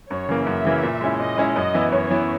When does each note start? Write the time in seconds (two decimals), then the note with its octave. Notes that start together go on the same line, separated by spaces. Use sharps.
0.11 F#2 C#5
0.29 C#3 E3 A#3
0.46 F#2 E5
0.65 C#3 E3 A#3
0.83 A#2
1.01 G#3 C#4 E4
1.20 A#2 D#5
1.38 G#3 C#4 E4
1.56 F#2 D#5
1.74 E3 B3 E4
1.92 F#2 C#5
2.10 E3 B3 E4